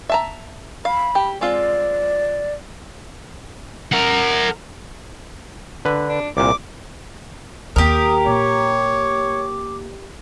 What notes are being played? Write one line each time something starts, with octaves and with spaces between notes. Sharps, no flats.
E5 A5 A#5
F5 B5
G4
G#3 C4 F4 D5
A#4 F#5
D3 B4
D4
C2 A#2 D6
D#2 G4 A#4 D#6
A#2 C#5 D6